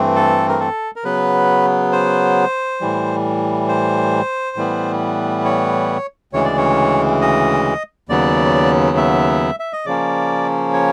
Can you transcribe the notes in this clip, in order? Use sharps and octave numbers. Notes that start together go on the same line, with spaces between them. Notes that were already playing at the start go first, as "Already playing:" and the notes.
Already playing: G2 E3 A3 C4
A4
A#4
A4
A#4
C#3 F#3 B3 B4
C5
A2 E3 G3
C5
A2 E3 G3 B3
C#5
D2 C#3 E3 G#3 C#5
D5
C#5
D#5
D#2 C#3 F#3 B3 D5
E5
E5
D#5
C#3 F3 A#3 C#4 D5
C#5